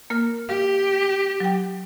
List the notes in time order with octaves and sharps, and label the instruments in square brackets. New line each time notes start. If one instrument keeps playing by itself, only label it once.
[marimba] A#3 A#4 F6
[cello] G4 [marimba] F5
[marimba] F#3 G5